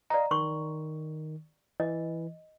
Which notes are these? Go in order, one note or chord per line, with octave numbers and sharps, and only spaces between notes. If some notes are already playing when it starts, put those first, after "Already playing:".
D5 D#5 F5 A#5
D#3 C6 C#6
E3 D#5